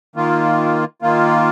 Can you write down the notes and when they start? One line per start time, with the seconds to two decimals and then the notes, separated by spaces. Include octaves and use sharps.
0.16 D#3 A#3 F4
1.02 D#3 A#3 F4